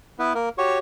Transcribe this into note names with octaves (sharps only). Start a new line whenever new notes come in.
B3 E4 B4
A#3 A#4
F#4 G4 C#5 C#6